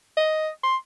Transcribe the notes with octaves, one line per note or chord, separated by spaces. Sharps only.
D#5
C6